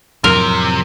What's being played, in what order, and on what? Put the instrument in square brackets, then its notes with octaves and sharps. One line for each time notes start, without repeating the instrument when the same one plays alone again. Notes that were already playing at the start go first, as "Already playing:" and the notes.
[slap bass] F2 A2 F#3 [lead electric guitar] C3 [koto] A#4